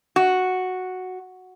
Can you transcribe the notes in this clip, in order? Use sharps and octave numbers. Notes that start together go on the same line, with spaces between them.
F#4